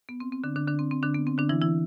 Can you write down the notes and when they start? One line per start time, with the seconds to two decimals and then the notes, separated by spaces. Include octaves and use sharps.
0.09 B3
0.20 C4
0.32 C4
0.44 D3 D4
0.56 D3 D4
0.67 D3 D4
0.79 C4
0.91 C4
1.03 D3 D4
1.14 B3
1.27 C4
1.38 D3 D4
1.49 E3 E4
1.62 E3 E4